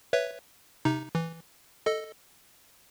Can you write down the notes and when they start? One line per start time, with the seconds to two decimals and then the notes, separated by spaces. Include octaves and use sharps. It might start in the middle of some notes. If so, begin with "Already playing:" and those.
0.13 B4 C#5 E5
0.85 C3 D#4
1.15 E3
1.86 A4 D#5